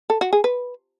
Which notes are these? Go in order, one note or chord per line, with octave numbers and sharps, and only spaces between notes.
A4
F#4
G#4
B4